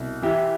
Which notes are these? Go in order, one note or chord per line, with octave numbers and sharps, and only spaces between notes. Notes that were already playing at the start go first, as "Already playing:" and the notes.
Already playing: C2 B2
E3 E4 G4